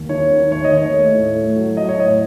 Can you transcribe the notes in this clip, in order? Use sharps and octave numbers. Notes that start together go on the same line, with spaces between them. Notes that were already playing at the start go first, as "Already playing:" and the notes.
Already playing: D#2
D#3 C#5
D#3
D#2 C#5
D#5
D#2 C#5
A3
A2
A3
F#3
F#3 D#5
C#5
A2 D#5